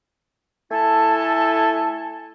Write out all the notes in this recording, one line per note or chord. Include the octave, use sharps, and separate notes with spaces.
A3 E4 A4 G#5 A5